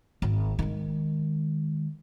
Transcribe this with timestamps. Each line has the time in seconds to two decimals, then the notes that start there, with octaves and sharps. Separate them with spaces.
0.22 G#1
0.59 D#3 G#3